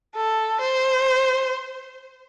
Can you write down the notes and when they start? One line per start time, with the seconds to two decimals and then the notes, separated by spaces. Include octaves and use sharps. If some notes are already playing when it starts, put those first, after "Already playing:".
0.16 A4
0.61 C5